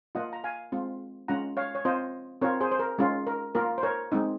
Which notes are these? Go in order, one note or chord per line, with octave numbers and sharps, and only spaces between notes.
A#3 F4 D#5 F#5
A#5
F5 G#5
G#3 C4 F4
G#3 C#4 F4 F#5 A#5
C#5 F5
C#5
C4 F4 C5 D#5
C4 F4 A#4 C#5
G#4 C5
C5
A#4
G#3 C#4 F4
A#4
A#3 F4 A#4
C5
A#4 C#5
G#3 C4 D#4